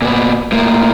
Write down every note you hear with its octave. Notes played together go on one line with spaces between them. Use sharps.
A#2 B3
A2 A#3